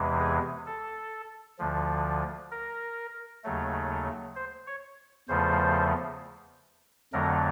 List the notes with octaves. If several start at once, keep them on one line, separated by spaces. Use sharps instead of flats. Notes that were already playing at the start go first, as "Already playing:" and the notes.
Already playing: E2 C3 E3 G#3
G#4
A4
D2 D3 F3
A#4
D#2 C#3 F#3 A3
C5
C#5
E2 C#3 F3 A3 C5
F2 D3 F#3 A3 A#4